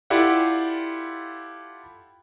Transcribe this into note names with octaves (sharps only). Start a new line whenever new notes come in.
E4 F4 G4 A4 D5 F#5